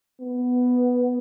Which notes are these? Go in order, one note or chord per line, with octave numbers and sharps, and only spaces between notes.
B3